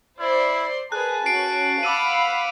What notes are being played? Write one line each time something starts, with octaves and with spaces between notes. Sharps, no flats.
E4 C5 D5 C6
G#4 A#4 B4 A5 F#6
C#4 F#4 C7 D7
F5 F#5 B5 D6 E6 D#7